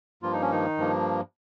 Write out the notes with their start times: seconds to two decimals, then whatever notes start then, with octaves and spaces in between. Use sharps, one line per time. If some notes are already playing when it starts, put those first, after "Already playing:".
0.23 G2 F3 A#3 F4
0.32 D#4
0.42 C#4
0.51 D#3 D#4
0.78 G2 F3 A#3